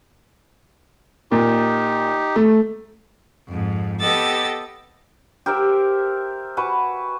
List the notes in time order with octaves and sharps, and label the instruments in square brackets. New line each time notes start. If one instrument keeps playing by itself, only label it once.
[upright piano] A#2 [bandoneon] D#4 G4
[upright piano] A3
[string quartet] F2 G#2
B3 G4 A4 D#5 E6 A6
[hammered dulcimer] G4 A#4 C5 E5
F#4 B4 G#5